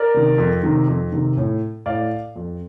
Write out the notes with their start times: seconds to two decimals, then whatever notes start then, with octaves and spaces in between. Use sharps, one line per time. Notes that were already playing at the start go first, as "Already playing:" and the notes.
Already playing: A#4 D5
0.14 C3 D#3
0.38 F2
0.63 C3 D#3
0.88 F2
1.12 C3 D#3
1.37 A2
1.86 A2 D5 F5
2.36 F2